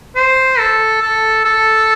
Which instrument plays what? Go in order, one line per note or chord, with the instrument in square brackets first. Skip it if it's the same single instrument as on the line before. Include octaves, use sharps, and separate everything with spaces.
[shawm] C5
A4
A4
A4